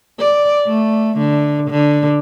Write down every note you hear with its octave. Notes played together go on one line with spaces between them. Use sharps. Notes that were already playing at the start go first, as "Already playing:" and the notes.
D5
A3
D3
D3